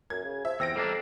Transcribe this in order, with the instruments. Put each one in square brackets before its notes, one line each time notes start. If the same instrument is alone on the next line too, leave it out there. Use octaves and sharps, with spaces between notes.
[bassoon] F#2 [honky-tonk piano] G#6
[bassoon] C#3
[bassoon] F3 [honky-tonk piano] E5
[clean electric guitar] E2 [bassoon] C4 [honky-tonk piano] E6 A#6 D7
[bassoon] F2 [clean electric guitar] G3 A#3 D4